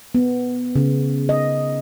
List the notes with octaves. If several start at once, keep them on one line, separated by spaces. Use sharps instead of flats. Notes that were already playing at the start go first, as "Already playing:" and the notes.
B3
C#3
D#5